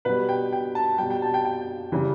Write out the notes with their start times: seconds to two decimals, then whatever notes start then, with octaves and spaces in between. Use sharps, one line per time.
0.05 B2 G3 B4
0.29 G5
0.52 G5
0.75 A5
0.98 B2 G3 G5
1.10 G5
1.22 A5
1.34 G5
1.45 G5
1.92 C#3 E3 G3